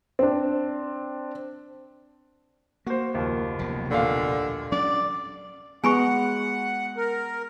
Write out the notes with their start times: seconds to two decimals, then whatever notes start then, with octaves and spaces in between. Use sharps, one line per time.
0.19 C4 D4
2.87 A#3 F#4 C5
3.14 F#1 D#2 F3
3.59 F1 B1 B2
3.90 D#2 A#2 D3 F5
4.72 F#3 C#4 D4 D5
5.84 G#3 B3 F#5 G#5 B5 C#6
6.97 A#4